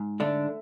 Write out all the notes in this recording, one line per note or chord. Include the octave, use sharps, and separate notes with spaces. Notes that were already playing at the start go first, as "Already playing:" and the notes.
Already playing: G#2
D3 A3 D4